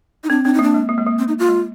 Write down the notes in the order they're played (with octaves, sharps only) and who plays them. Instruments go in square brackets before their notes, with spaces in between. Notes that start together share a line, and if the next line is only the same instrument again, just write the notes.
[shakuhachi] D#4
[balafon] C4 [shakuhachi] D4
[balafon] C4 [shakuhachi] D4
[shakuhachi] D#4
[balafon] A#3 [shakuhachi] D4
[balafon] G#3
A#3
G#3
A#3
[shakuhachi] C4
D#4
F4
[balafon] G#3